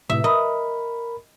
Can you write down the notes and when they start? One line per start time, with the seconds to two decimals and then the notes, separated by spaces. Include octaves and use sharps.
0.10 A2 C3 E5
0.24 A#4 D#5 B5